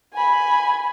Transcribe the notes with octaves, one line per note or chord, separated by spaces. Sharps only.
G#5 B5